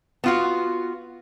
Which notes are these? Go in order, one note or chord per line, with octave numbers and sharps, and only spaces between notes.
B3 F4 F#4